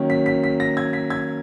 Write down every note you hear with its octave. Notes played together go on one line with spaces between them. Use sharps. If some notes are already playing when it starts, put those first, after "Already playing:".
Already playing: D#3 F#3 A#3 C#4
B6
B6
B6
A#6
G#6
B6
G#6